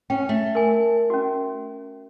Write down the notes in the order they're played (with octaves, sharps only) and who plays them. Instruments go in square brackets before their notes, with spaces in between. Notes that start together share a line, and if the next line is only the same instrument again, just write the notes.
[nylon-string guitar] C#4 [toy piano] G5
[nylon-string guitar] A3
[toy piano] A#4 G#5
C#4 F#4